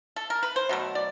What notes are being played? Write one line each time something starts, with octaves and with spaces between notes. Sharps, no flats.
A4
A#4
B4
C5
B2 F#3 A3
D5